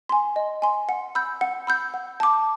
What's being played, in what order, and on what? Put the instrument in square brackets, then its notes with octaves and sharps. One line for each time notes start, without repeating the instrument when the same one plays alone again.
[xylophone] G#5 C6
D#5
G#5 C6
F#5
B5 E6 G6
F#5
B5 E6 G6
F#5
A5 D6